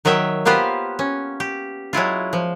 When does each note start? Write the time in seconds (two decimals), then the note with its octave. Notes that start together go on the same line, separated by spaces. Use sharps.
0.05 D#3 F#3 D#5 E5 G5
0.45 A#3 B3 F4 G4 B4 C5
0.99 C#4
1.40 G4
1.93 F#3 G#3 E4 F4
2.33 F3